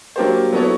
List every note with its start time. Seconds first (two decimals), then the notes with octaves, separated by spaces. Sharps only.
0.16 F#3 A#3 D4 G4 C5
0.53 F#3 B3 E4 A4 C#5